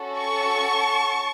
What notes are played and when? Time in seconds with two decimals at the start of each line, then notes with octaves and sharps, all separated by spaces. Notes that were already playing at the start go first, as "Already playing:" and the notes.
Already playing: C#4 F#4 A4
0.18 A5 C#6